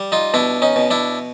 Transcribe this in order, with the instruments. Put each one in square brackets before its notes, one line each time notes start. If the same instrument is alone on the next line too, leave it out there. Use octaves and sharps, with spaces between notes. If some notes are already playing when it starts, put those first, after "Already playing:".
Already playing: [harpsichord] G3
D#4 F4
B2 D4 E4
C#4 D#4
B2
D4 E4